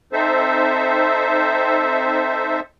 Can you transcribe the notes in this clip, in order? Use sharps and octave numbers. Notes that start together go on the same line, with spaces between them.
C4 D#4 A4 C5 E5